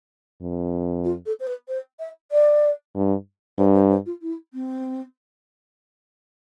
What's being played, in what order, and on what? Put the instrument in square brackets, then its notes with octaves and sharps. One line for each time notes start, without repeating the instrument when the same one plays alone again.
[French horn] F2
[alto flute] F4
A4
C5
B4
C5
E5
D5
[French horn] G2
[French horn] G2 [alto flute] C5
[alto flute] C5
C5
F4
E4
C4